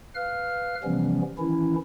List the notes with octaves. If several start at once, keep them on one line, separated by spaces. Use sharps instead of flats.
B4 F5 F6
C3 E3 F3 G3 B3 C#4
D#3 E3 C#4 E4